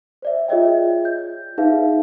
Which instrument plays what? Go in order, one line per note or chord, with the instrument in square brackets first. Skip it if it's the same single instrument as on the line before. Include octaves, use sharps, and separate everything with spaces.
[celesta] C5 D5 E5
F4 G#4 C#5 D#5 E5 G5
G6
D#4 G#4 B4 E5 F5